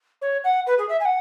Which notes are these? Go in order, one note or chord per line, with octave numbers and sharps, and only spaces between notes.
C#5
F#5
B4
G#4
E5
G#5
F#5